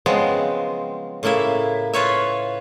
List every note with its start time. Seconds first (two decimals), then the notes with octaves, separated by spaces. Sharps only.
0.06 C#3 F3 F#3 G#3 B3 C4
1.23 A2 C#3 A#3 E4 E5
1.93 F4 B4 C#5 E5